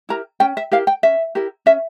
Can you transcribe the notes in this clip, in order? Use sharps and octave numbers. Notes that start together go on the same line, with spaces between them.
E4 G4 A#4 A#5
C#4 G5
E5
E4 G4 A#4 F5
G5
C#4 E5
E4 G4 A#4
C#4 E5